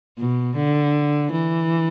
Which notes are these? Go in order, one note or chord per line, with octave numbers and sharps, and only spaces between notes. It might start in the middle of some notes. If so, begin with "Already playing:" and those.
B2
D3
E3